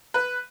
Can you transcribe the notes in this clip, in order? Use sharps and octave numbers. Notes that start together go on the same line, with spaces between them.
B4